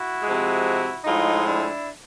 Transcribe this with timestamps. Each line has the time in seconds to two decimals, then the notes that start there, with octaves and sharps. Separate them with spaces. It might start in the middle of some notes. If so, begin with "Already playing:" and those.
Already playing: E4 F#4
0.23 C3 F3 G#3
1.05 A2 F3 G#3 D#4 F4
1.46 D4 E4